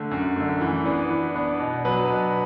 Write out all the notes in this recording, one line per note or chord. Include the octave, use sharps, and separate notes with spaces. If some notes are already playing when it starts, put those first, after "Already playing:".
Already playing: D3 A3
F#2
D3 A3
E3
B3 D4
E3
B3 D4
B2
F#3 B3 D4 B4
B2